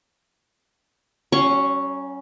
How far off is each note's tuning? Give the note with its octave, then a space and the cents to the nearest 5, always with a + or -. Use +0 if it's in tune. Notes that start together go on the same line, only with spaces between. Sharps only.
F#3 +45 C#4 +0 C#6 +0